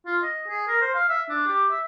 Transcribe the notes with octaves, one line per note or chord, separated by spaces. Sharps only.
F4
D#5
G#4
A#4
C5
F5
E5
D4
G4
E5